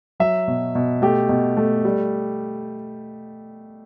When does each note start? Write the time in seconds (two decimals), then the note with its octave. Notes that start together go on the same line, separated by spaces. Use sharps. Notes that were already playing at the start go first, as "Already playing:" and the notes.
0.20 F#3 E5
0.48 B2
0.75 B2
1.02 A3 G4
1.29 B2
1.57 A3
1.85 G3